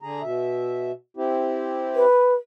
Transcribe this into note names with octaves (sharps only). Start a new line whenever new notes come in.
D3 G#4 A#5
B2 E5
C4 E4 G4
B4